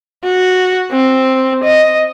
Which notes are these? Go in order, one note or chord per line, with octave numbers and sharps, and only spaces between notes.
F#4
C4
D#5